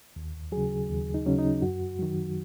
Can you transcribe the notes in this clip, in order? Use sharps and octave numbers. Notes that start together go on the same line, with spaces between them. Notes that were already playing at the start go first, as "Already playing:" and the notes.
D#2
C#3 F#3 G#4
D#2
D#4
C#3 F#3 C#4
D#4
F#2 F#4
D#3 F#3